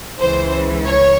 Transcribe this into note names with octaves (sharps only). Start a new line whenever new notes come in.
C#2 C#3 E3 C5
C#5